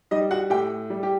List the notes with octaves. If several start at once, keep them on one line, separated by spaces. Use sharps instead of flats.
G3 D#4 D#5
F#4 F#5
A2 G4 G5
G3
G4